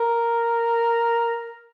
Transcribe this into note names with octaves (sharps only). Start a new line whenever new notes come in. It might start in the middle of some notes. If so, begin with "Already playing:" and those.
Already playing: A#4